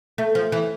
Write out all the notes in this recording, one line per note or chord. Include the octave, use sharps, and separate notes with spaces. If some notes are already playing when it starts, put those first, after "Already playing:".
A3
F3
E3